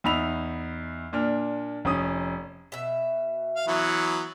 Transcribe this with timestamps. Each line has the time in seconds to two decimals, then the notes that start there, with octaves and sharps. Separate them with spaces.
0.04 E2 D#4 B5 E6 F7
1.13 A#2 D4 F6
1.85 F1 C#4 D#6
2.72 B2 E5
3.56 F5
3.68 E3 F#3 B3